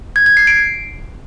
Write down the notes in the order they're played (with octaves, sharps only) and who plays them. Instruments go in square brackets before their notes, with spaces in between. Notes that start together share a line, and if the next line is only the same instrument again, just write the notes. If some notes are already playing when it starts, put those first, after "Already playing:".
[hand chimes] G#6
G#6
C7
D7